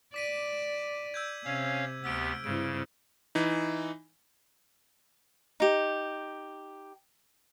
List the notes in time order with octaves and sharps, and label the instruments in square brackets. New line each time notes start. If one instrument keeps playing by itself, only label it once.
[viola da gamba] D5 [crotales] D6 B6 D#7
[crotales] E6 G6 G#6
[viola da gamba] C3 [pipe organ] C#4 C#5 F5
[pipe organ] D2 B3 G4 [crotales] E6 F6 D7
[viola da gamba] G2 C4 E4 [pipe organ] C#3 [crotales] D7
[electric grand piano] E3 D#4
[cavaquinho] D#4 G4